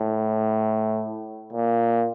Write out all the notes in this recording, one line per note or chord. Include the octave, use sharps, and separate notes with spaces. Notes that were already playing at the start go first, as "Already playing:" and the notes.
Already playing: A2
A#2